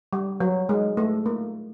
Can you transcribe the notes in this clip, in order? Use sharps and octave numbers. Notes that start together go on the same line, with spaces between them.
G3
F#3
G#3
A3
A#3